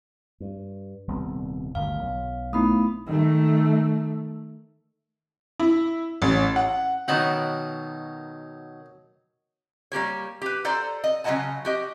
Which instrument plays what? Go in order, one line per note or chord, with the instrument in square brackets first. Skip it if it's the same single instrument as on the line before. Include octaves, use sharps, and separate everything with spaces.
[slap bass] G2
D#1 C2 B3
[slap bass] G1 D2 D#3 [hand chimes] F5
[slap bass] B1 F#3
[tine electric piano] A3 D#4 E4 [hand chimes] B3 B5 D#6
[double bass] D#3 A3
[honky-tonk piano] E4
A1
F#5
[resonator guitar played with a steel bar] B2 D#3 F#5 [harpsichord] F#3 D#4
[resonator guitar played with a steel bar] G3 A#3 G4 C#5
G4 B4
A4 C5 D5 A#5
D#5
C#3 F#3 F4 D#5 F#5 A5
F#4 G4 D#5